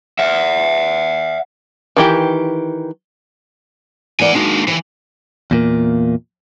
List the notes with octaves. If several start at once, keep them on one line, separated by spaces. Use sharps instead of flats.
E5 F#5
D#3 E3 G4
E3 A#3 D5 F#5 G#5
G#3 A#3 D4 D#4 F#4
D#2 C3 E3
E2 A#2 A#3